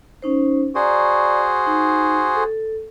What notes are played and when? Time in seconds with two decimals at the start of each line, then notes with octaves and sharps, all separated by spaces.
0.22 C#4 D#4 C5
0.75 F#4 G#4 C5 D5 A#5 C#6
1.67 D#4
2.36 A4